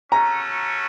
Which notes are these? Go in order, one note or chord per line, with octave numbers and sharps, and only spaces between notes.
A3 C#4 F#4 A#5